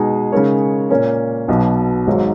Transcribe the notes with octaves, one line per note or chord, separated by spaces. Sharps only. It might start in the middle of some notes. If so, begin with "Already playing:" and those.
Already playing: B2 G#3 D#4 G#4
C#3 G#3 D#4 A#4 C#5
A#2 A#3 C#4
B1 B2 F#3 B3
G#1 G#2 F#3